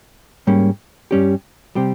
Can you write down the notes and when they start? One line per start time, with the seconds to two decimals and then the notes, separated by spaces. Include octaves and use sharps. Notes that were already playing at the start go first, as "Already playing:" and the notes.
0.47 G#2 G3 A#3 C#4
1.11 G2 G3 C#4 G4
1.75 C3 G3 C4 G4